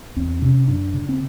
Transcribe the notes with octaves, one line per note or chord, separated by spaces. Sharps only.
E2 C4
C3 C#4
F#2 D4
C#3
C4